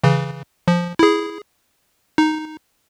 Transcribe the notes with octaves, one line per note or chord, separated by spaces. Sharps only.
C#3 E3
F3
E4 G#4
D#4